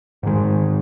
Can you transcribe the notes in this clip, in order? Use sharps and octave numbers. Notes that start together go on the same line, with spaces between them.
G#2 D#3 G#3